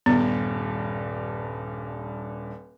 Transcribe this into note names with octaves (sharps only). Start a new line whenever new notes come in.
D#1 G2 B3